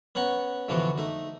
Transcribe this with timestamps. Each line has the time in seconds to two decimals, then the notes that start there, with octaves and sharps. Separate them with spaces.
0.15 B3 C#4 F#5 A#5 C#6
0.68 B2 D3 E3 F3 B3 F#4
0.98 A3 D#4